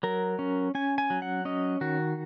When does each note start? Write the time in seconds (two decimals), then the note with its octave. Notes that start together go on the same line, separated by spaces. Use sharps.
0.03 F#3 A#4
0.39 C#4
0.75 C#4 G#5
0.98 G#5
1.10 F#3
1.22 F#5
1.45 C#4 D#5
1.81 D#3 F#4